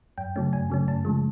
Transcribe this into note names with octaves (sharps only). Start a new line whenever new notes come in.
F#2 G5
C#3 F#3 A3 C#4
F#2 G#5
C#3 F#3 A3 C#4
F#2 A5
C#3 F3 G#3